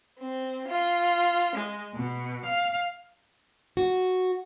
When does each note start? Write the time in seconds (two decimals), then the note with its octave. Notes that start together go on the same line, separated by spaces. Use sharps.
0.19 C4
0.68 F4
1.56 G#3
1.93 B2
2.44 F5
3.77 F#4